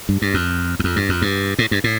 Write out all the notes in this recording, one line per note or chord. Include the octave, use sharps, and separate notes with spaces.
G2
G2
F2
E2
F2
G2
F2
G2
A2
G2
A2